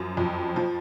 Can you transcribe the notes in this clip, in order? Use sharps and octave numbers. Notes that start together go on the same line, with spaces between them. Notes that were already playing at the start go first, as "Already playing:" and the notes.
Already playing: F#2 F3
F2
F3